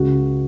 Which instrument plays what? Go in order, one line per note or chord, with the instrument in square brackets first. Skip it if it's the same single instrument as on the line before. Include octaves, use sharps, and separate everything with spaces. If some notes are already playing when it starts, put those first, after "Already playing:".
Already playing: [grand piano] C#2 F#4